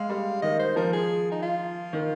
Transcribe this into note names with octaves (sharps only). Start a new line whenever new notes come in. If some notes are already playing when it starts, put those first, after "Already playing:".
Already playing: G#3 F5
G3
D#3 D#5
C5
F3 A#4
G#4
D#4
F4
D#3